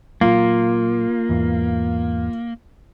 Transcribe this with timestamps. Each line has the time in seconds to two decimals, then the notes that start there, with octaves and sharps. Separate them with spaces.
0.21 A#2 F#3 A#3 F4
1.29 E2 G#2 E3